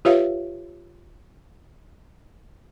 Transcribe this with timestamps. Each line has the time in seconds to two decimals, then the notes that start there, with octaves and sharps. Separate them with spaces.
0.05 F4 G4 B4 C#5 E5 F5